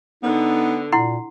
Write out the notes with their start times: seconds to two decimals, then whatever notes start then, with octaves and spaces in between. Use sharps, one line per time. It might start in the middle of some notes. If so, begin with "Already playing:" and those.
0.23 D3 B3 D#4
0.92 A#2 E4 F#5 C6